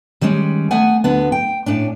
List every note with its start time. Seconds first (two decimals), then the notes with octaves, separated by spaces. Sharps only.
0.21 D#3 G3 G#3 C#4
0.71 A3 B3 F#5 G#5
1.04 D2 D3 B3
1.32 G5
1.66 A2 C#4 D4